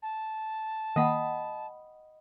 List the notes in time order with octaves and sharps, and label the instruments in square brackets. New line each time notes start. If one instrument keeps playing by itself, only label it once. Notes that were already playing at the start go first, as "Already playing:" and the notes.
[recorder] A5
[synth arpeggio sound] D#3 A#3 [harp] D#5 B5 [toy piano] F#5 G5